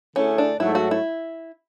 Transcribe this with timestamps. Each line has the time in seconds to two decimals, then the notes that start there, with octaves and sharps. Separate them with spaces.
0.16 D3 A3 C#4 E4 G#4
0.38 D4
0.60 G#2 F#3 A3 E4
0.75 F#4
0.91 E4